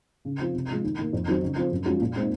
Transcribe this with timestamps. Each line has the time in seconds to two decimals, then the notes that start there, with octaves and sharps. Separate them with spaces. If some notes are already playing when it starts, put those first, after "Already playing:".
0.25 C#3
0.40 F3 C4 F4
0.54 C3
0.69 F3 G#3
0.84 D#2
0.98 D#3 A#3
1.13 F2
1.28 D#3 F#3 C4
1.43 C#3
1.56 F3 C4
1.72 F#2
1.85 F3 G#3 C#4 F#4
2.00 A#2
2.16 G#3 C4 D#4